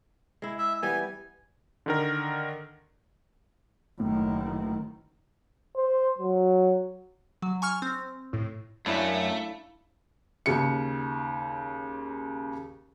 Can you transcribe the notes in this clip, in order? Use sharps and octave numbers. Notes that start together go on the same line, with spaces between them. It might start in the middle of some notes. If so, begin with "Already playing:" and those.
G#3 E4
E5
E3 G3 B3 G#5
D3 D#3 A#4
F#1 A2 D#3
C5
F#3
F#3
G#5 C#6 F6
C4
A2
F#2 A3 D4 E4 F5
D#2 C#3 C#7